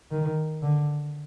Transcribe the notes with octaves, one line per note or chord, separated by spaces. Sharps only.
D#3
D3